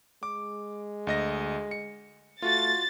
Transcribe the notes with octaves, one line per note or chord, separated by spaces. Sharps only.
G#3 D6
D2 D#5 A#6
C#7
A3 F4 F#4 A6